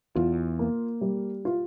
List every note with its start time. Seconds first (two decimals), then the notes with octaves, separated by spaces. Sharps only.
0.15 E2 F4
0.59 A#3
1.01 G3
1.45 F4